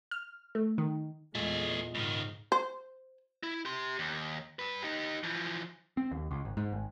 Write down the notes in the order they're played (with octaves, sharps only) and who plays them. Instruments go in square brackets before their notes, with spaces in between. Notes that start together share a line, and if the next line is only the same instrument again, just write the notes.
[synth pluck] F6
A3
D#3
[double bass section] E2 G#3 [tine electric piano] A#2 F4 D#5 [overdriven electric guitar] A3 G#4
[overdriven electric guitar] C#2 D#3 [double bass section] G#2
[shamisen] C5
[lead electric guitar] E4
G4 C6
D#2
G2 B4
D#4 G4
E3 F3
[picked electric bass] C4
D#2
C#2
G#1
G#2
G#1